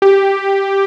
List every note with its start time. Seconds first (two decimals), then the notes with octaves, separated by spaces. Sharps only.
0.02 G4